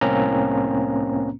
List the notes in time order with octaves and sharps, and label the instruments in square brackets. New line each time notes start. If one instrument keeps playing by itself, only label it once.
[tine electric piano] C2 A2 A#3 C4 C#4 A#5